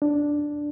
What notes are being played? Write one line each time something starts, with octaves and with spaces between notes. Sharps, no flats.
D4